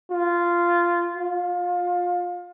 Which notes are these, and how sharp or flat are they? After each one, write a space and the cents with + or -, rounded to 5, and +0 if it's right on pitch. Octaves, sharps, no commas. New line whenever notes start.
F4 -10
F4 +25